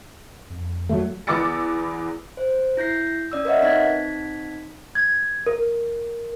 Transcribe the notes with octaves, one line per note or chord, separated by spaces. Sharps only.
F2
F#3 G3 A3
E2 B3 D6 E6 A6 C#7
C5
E4 G6 A#6 C7
C#4 D5 E6
A#4 B4 C#5 D#5 E5 F#5
C4 D#4 G#6 B6
G#6
A#4